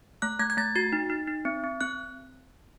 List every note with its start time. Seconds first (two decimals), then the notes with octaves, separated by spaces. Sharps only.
0.22 A3 F#6
0.39 A3 G#6
0.50 G#6
0.57 A3 A6
0.76 F#4 A6
0.93 D#4
1.10 D#4
1.27 D#4
1.45 C4
1.64 C4
1.81 C4 F#6